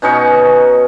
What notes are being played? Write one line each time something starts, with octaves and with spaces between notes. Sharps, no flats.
B2 C#4 D#4 C#6